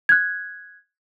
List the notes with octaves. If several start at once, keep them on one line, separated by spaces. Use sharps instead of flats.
F#6 G#6